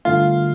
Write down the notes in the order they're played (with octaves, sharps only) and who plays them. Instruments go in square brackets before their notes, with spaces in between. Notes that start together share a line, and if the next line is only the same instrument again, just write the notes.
[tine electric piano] G2 D3 A3 [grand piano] F4